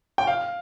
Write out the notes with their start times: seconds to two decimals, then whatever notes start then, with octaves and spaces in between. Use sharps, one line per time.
0.18 G5
0.27 F5